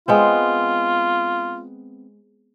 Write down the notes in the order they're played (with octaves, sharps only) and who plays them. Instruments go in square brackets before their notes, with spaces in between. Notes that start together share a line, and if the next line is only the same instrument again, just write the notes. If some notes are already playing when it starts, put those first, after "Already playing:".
[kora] G#3 B3 C4 [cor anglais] F4